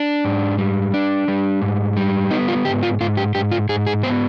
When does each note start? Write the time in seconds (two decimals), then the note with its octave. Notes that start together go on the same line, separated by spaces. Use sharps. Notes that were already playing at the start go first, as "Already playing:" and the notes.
Already playing: D4
0.25 G#2
0.58 G3
0.94 D4
1.28 G3
1.62 G#2
1.97 G3
2.31 B3 D#4
2.48 F4
2.65 G#2 G4
2.83 F4
3.00 G#2 F4
3.17 G4
3.35 G#2 G4
3.51 F4
3.69 G#2 G#4
3.87 G#4
4.03 B3 C5